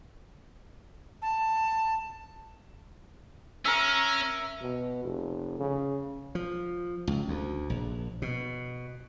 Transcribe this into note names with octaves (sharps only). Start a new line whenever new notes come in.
A5
C#4 A#4 E5
B2
F1
C#3
F3
C#2
D2
A#1
B2